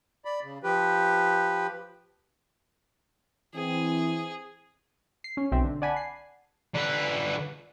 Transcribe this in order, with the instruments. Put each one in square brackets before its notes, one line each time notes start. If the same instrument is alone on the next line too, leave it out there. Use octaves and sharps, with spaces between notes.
[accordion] D5 B5
C#3
F3 G4 B4
[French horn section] E3 C4 [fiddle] G#4
[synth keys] C7
C#4
B1 C4 E5
D3
D5 F#5 G#5 A5 B5
C7
[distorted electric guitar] D3 B4